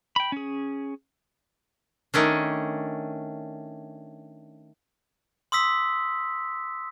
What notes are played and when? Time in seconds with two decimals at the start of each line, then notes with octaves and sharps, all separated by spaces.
0.16 G5 B5
0.32 C#4 G#4
2.14 D#3 A3 C#4 D4
5.52 C6 D#6 E6 B6